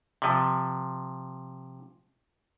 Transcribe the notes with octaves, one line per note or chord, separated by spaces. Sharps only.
C3 F3